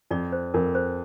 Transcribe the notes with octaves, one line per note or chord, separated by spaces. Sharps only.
F2 D5
C5
F2 A#4
C5